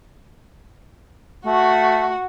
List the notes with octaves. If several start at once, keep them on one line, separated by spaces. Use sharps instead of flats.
A3 F#4